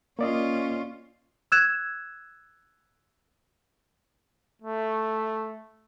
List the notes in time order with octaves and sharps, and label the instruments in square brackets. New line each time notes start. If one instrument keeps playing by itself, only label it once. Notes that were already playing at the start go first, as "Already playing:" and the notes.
[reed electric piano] A#3 D5 D#5 [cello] C#4 F4
[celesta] E6 F#6 G#6 E7
[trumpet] A3